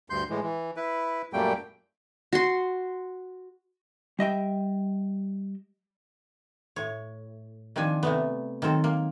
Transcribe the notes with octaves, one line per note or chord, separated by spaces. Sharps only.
D2 G2 C6 G6
A2 E3 G#3
E3
E4 B4
F#2 A#2 G3 A3 A#3 G5
F#4 C6
G3 D#5 E5 G5
A2 C#5
D#3 F3 C4 D4 G#5
C3 A3 B3
D#3 F#3 C4 A4
A#3